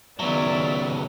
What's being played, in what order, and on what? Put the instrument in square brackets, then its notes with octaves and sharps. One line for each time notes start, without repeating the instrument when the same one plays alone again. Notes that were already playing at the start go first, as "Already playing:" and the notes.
[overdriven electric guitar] C#2 F#3 [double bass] D#3 B3 [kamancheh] D5 E5